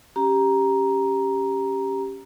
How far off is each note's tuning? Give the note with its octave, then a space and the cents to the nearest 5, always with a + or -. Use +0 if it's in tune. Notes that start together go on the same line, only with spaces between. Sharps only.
C#4 +0 G4 +0 A#5 +10